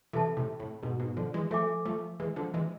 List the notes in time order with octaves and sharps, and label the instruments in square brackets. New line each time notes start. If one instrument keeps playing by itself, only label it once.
[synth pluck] C3 E3 [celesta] A4 E5 A5
[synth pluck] A2 C3
A2
G#2 B2
G#2 B2
D3 F3
E3 G#3
[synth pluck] F3 A3 [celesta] A4 E5 G#5 D6
[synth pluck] F3 A3
E3 G#3
D3 F3
E3 G#3